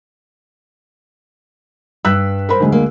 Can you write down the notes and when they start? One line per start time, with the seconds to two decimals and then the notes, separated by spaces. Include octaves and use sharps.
2.05 G2 E6 F#6 B6
2.49 A#4 C5 B5
2.60 D2 G#3
2.72 A#3